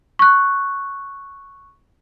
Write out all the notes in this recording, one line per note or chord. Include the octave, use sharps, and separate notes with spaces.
C#6 F#6